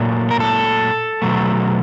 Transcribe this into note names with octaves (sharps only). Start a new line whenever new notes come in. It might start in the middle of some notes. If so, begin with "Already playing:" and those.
Already playing: A#2 F#3 A3
A#4
A4
B2 F#3 A3